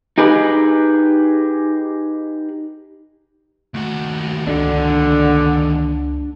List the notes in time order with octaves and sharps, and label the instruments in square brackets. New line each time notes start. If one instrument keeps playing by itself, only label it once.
[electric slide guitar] D#4 G4 G#4 B4
[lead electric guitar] D#2 F#4 [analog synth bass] A3
[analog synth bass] C#2 [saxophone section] D3 [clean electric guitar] D4